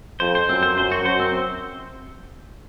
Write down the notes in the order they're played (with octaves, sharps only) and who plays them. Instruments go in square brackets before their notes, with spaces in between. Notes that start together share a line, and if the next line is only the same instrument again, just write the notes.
[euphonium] F2 [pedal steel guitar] C5
[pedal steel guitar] C5
[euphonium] F#2 [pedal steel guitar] C4
[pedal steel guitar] C5
[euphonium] F#2 [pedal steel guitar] C5
[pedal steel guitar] F#4
[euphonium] F#2 [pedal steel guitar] C5
[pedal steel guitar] C4